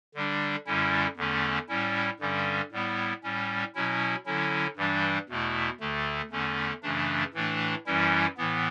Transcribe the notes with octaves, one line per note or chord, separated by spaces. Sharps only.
D3 G3 D4
F#2 D3 G3 C#4 E4
E2 D3 A3 C#4
A2 G3 C#4 E4
G2 D3 G3 C#4
A2 G3 B3 E4
A2 G3 C#4
B2 F#3 C#4 E4
D3 F#3 C#4 E4
G2 E3 G3 D4
E2 B2 A3 E4
D2 D3 A3
E2 D3 A3 C#4
F#2 C#3 E3 A3 D4
A2 E3 A3 D4
F#2 E3 G3 C#4 E4
A2 E3 B3